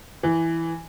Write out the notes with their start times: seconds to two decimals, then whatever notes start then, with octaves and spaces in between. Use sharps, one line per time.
0.23 E3